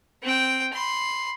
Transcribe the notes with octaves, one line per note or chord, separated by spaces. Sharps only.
C4 G5
B5 C6